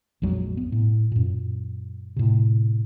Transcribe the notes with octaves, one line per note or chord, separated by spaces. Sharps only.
A#1 F2 F#3 G#3
B3
A2
F#2 A#2
A2 C3